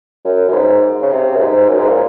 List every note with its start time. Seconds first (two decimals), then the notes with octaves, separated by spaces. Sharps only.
0.25 F#2
0.48 F#2
0.53 G#2
1.02 C#3
1.11 C3
1.36 F#2
1.41 G#2
1.69 F#2
1.78 G#2
1.88 A#2